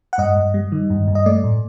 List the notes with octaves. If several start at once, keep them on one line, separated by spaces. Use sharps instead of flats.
F#5
G2 D#5
G2
G3
D#3
G2
G2
D#5
A3 D5
A2